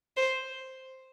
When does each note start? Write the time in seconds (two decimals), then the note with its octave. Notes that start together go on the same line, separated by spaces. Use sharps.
0.17 C5